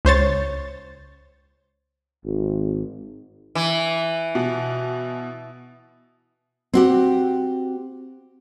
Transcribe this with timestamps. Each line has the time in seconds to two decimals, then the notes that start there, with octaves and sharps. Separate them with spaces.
0.05 C#2 C5 C#5 A6
2.24 G#1
3.55 E3
4.35 B2
6.73 C4 F#4 G4